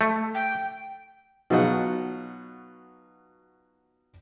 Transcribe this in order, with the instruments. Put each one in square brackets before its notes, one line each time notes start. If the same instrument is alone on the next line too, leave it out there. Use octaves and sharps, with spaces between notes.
[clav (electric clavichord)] A3
[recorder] G5
[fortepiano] B2 F#3 D#4 F4 D#5 F#5